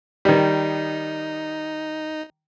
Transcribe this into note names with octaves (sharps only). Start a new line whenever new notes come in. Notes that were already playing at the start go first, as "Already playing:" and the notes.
D#3 G3 D#4